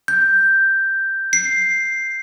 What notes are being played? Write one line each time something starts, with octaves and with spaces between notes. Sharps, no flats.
G6
C7